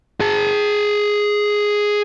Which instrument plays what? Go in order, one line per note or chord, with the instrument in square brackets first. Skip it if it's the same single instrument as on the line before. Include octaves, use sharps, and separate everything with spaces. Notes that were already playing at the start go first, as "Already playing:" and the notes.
[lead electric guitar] G#4 A5